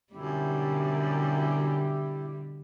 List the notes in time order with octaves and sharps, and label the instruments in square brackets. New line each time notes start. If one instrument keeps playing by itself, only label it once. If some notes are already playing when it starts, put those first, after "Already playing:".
[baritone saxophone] F#2 [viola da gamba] B2 D3 G3 [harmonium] E4 G4